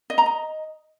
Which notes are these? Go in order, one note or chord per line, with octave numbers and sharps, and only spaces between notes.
D#5
A#5
D#5